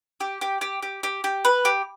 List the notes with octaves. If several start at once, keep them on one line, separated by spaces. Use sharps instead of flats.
G4
G4
G4
G4
G4
G4
B4
G4